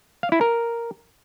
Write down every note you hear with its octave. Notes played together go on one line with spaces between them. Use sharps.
F5
E4
A#4